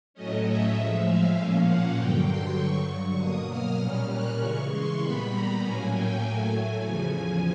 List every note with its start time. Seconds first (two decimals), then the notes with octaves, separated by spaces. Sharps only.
0.14 A2 F#3 A3 C#4 D#5
0.45 E5
0.75 A2 F3 G#3
1.05 F5
1.36 A#2 F3 A#3 C#4
1.66 F#5
1.96 G2 D3 F#3 G5
2.27 C6
2.57 G2 D3 F#3 C#6
2.88 C#6
3.18 B2 F#3 A#3 D#6
3.49 F6
3.78 A#2 G3 A#3 C#4 F6
4.09 F#6
4.39 C#3 E3 G#3 C#6
4.70 C6
5.01 A#2 G3 B3 B5
5.30 A#5
5.61 A2 F#3 A#3 C#4 G#5
5.92 G5
6.22 A2 F#3 A3 G#5
6.53 G#5
6.83 E2 C#3 F3